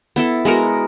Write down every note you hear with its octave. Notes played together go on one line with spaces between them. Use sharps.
B3 E4 A4
G#3 B3 F#4 A#4